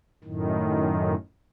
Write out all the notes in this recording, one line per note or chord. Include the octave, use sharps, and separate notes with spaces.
F#2 A2 D#3